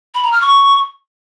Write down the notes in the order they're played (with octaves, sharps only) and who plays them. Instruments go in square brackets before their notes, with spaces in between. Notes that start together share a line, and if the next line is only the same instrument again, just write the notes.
[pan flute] B5
A#5
F6
C#6